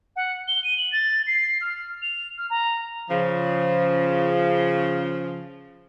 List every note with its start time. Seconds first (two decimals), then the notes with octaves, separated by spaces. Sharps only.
0.16 F#5
0.48 G7
0.64 D#7
0.78 F#7
0.92 A6
1.27 C7
1.61 F6
2.02 F7
2.38 F6
2.50 A#5
3.10 C#3 F3